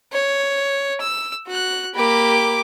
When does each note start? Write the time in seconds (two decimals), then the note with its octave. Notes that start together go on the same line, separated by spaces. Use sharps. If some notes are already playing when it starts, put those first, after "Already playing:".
0.12 C#5
1.01 E6
1.46 F#4 F#6
1.95 A#3 G4 B5 D6